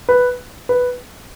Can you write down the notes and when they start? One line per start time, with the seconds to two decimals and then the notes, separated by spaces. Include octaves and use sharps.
0.09 B4
0.69 B4